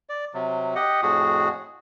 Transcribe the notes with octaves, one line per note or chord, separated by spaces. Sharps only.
D5
C3 F#3
G4 D#5 F#5
F2 A2 F#4 G#4